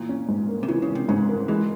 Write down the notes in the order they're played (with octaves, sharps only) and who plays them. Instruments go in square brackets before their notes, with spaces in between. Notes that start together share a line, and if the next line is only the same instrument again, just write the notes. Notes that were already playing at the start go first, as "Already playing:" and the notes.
Already playing: [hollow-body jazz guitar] A#2 [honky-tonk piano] E3
[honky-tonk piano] C#4
G#2
A#3
[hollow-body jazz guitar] C3
[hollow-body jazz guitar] C#3 [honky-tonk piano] E3
[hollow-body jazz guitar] C#3
[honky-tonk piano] C#4
[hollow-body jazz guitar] C3
[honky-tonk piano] G#2 [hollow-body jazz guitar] C#3
[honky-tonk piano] A#3
[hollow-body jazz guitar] E3 [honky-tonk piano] G#3